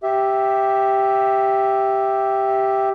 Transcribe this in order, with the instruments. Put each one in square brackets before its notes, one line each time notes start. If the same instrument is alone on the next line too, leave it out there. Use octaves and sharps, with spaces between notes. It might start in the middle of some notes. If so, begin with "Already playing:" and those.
[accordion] G4 E5